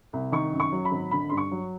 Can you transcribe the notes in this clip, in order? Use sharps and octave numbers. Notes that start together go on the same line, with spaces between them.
C2
D#3 C#6
F#2
C#6
F#3
B5
G#1
D3 B5
G2 C6
C#6
F#3